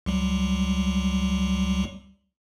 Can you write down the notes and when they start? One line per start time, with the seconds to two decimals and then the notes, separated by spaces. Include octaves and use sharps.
0.06 C#2 F#3 G3